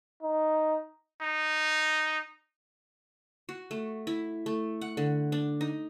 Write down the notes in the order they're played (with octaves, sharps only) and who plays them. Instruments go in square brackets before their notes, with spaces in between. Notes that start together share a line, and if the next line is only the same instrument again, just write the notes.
[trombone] D#4
[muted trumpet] D#4
[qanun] F#4
A3
E4
A3
F#5
D3
D4
D#4